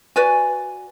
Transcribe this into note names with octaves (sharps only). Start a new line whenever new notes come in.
F#4 B4 D5 G#5